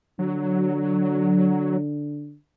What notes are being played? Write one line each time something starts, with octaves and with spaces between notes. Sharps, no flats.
D3 F#3